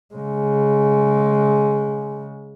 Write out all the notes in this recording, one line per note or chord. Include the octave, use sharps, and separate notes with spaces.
C#3 G#3